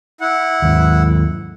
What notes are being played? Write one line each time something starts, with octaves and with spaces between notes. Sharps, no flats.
E4 F#5
D#2 G#2